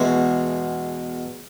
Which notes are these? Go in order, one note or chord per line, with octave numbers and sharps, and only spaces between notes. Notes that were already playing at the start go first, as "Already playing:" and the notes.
Already playing: E2 B2 G#3